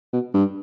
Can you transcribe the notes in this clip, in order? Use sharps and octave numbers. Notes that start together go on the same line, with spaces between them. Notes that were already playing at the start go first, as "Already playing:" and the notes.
B2
G2